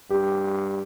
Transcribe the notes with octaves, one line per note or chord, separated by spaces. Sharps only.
G2 G4